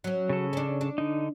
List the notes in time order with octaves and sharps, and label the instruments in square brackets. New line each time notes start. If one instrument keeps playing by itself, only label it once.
[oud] F#3 C#4
[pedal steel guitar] C#3 A4
[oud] C#4 D4
D4
[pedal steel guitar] D3 D#4